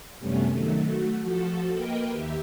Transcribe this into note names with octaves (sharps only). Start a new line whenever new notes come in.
F#2 C3 G3 A3 B3 C#4
D#3 F#3 A3
A3 F#4
F3 F#4 A4
A#3 A#4 B4 D#5 G5
D#2 G4 E5